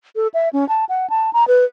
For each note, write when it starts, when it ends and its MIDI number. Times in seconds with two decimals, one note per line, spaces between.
0.16 0.28 69
0.34 0.49 76
0.53 0.67 61
0.69 0.85 81
0.89 1.09 78
1.10 1.33 81
1.33 1.47 82
1.48 1.65 71